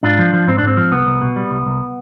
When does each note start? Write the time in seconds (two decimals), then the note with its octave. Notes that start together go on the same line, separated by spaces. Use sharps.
0.03 G#2 D4 F4
0.19 F3
0.33 F3
0.47 G#2 C4
0.58 D4
0.63 G#2 C4
0.77 F3
0.92 C2 B3
1.07 C2
1.22 B2
1.36 G3
1.51 C2
1.66 C2